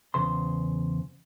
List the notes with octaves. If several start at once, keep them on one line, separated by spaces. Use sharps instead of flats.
E2 C#3 C5 C6